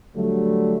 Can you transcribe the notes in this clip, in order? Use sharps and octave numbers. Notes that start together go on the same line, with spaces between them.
D3 F#3 G3 A3